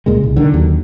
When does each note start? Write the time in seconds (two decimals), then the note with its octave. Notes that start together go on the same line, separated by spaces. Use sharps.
0.06 C#2 A#2 C#3 G#3
0.24 C2
0.36 D3 D#3
0.54 D#2 F#3